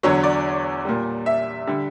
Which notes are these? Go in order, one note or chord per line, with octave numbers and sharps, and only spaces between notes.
E2 D3 F#3 C#5
D5
A#2 G3
E5
D3 G3